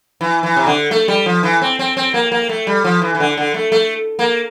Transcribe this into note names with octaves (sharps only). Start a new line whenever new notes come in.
E3
E3
C3
D3
A3
G3
F3
E3
C4
C4
C4
A#3
A#3
A3
G3
F3
E3
E3
D3
D3
A3
A3
A#3